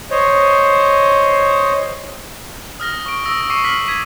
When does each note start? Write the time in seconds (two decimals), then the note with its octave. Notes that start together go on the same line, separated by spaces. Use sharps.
0.11 C5 C#5 D#5
2.80 D#6 F6 A#6 G7
3.06 C#6 D7
3.25 D#6 E6 A#6
3.50 C#6 D6 A#6 C7 C#7 D#7
3.64 F6 B6 F#7
3.88 G#6 B6 D#7